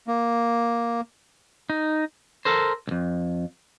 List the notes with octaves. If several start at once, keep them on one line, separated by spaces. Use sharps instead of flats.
A#3
D#4
A4 A#4 C5
C2 F2